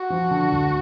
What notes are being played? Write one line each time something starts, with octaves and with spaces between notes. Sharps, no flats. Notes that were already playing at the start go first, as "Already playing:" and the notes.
Already playing: F#4
F3
D3
D2